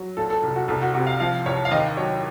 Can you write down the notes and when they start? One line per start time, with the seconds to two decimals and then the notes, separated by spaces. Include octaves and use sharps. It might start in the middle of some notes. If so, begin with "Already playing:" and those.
Already playing: F#3
0.17 A#2 A4
0.30 A4
0.43 C2
0.56 F#4
0.68 C2 A4
0.82 F#4
0.94 C3 F#4
1.07 F5
1.20 F3 F5
1.46 C2 C#5
1.65 F5
1.71 D#2 D#5
1.97 F#3 C#5